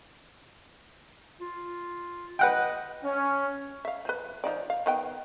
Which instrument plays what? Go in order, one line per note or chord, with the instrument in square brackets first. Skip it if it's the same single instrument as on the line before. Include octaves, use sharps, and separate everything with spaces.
[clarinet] F4
[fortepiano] B4 F#5 G5 [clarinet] D#5
[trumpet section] C#4
[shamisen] E5 F5
F3 B4
F3 D#4 D5
F5
D#3 B3 G5